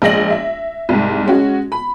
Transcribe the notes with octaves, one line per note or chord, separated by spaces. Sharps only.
A#1 G#3 D#5 A#6 F#7
E5
C2 G#2
G#3 C#4 F#4
B5